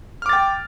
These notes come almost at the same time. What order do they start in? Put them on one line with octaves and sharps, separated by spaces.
F6 D6 A6 G5